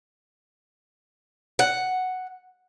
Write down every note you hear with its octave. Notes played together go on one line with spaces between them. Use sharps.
F#5